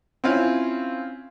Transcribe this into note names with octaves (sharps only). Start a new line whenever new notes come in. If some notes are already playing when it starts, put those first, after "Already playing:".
C4 C#4 E4 F4 F5 G#5